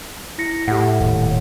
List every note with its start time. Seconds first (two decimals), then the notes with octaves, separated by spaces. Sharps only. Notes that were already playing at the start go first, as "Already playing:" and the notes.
0.38 E4 A#6 C#7
0.68 A2 G4 F#5
1.00 D#1